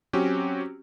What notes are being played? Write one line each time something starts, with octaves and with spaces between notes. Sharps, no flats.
F#3 C4 C#4 F#4 G4